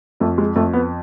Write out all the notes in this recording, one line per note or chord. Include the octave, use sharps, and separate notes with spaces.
F2 A3
G#3
F2 A3
B3